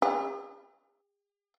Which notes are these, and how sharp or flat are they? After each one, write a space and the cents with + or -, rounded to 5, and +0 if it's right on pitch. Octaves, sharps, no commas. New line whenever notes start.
G#4 -45